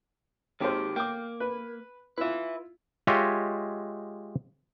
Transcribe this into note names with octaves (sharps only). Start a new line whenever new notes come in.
G#1 D#2 D#3 G4 C5
A#3 G5 D6
B4
E4 F4 B4 E5
G#3 F4 G4 C#5 D#5 E5